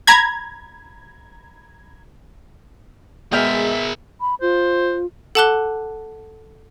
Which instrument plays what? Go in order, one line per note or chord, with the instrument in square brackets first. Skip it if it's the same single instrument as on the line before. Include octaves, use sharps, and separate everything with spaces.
[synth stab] A#5 B5 G#6
[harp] B2 G5 F6 [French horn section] G#3 [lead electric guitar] G#4 A#4 [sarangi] E5
[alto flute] B5
[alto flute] F4 [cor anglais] C5
[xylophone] A4 F#5 A5 D6 F#6 G7